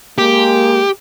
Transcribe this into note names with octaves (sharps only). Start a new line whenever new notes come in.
G#3 A#3 G4